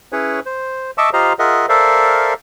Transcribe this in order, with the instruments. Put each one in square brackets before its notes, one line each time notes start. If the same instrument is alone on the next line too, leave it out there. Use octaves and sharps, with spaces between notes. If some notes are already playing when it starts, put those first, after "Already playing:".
[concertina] C#4 E4 G#4 B4 C#5
C5
D#5 E5 A5 C#6 D6 E6
F4 G4 C5 D#5 F5 A#5
F4 G#4 A#4 D#5 E5 F#5
A4 A#4 C5 D5 E5 F5